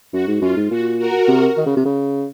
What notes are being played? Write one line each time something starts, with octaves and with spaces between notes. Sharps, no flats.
F#2 F#4
G#2
F#2 F4
G#2
A#2 F#4
F#4 A#4
C3
D#3
C#3
C3
C#3